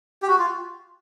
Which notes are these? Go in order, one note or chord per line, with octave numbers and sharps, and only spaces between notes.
G4
F#4
F4